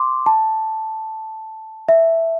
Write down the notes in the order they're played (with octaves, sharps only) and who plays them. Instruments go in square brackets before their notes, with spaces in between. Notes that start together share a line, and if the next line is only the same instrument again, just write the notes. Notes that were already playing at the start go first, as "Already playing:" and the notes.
Already playing: [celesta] C6 D6
A5
E5